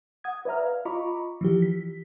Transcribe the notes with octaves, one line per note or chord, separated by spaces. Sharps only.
F#5 D#6 G#6
B4 D5 E5 A#5 F6
F5
F4 D#5 A#5 B5 C#6 D6
E3 F3 G4
B6